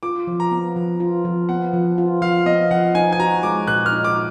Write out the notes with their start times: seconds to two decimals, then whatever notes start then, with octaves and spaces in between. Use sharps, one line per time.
0.03 F4 D6
0.27 F3
0.40 A#5
0.52 B3
0.76 F3
1.00 F4
1.25 F3
1.49 B3 F#5
1.74 F3
1.98 F4
2.22 F3 F5
2.46 B3 D#5
2.71 F3 F#5
2.95 D#4 G#5
3.12 G#5
3.20 F#4 A#5
3.43 G#3 D6
3.68 A#2 F#6
3.86 F6
3.92 D#4
4.04 D6